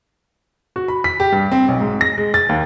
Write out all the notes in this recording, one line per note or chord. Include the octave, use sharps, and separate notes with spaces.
F#4
B5
B6
G4
G2
C4
B1
G#2
A#6
G#3
A6
D#2